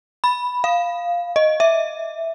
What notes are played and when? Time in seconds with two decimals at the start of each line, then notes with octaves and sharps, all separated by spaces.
0.24 B5
0.64 F5
1.36 D#5
1.60 E5